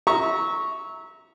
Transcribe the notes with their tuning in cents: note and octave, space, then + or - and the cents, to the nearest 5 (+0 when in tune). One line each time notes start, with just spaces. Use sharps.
E5 -25 A#5 +0 C#6 +0